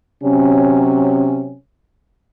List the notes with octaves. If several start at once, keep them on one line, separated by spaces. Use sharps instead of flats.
C3 F#3 C#4